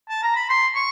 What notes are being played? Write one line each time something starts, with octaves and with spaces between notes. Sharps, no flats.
A5
A#5
B5
C6
C#6